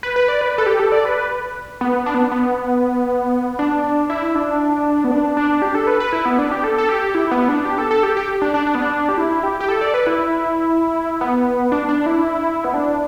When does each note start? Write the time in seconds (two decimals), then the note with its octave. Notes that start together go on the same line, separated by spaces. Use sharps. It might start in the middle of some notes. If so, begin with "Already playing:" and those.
0.03 B4
0.16 B4
0.28 D5
0.41 B4
0.58 A4
0.66 G4
0.80 A4
0.92 D5
1.05 B4
1.81 B3
2.06 D4
2.14 B3
2.32 B3
3.59 D4
4.10 E4
4.35 D4
5.04 B3
5.11 D4
5.37 D4
5.62 G4
5.75 A4
5.87 B4
6.00 B4
6.13 E4
6.25 B3
6.39 D4
6.51 G4
6.64 A4
6.78 A4
6.89 G4
7.15 E4
7.31 B3
7.48 D4
7.65 G4
7.78 A4
7.91 A4
8.03 G4
8.17 G4
8.42 D4
8.54 D4
8.67 D4
8.75 B3
8.82 D4
9.09 G4
9.18 E4
9.43 G4
9.60 G4
9.69 A4
9.81 D5
9.94 B4
10.07 E4
11.21 B3
11.72 D4
11.89 D4
12.06 E4
12.64 B3
12.74 D4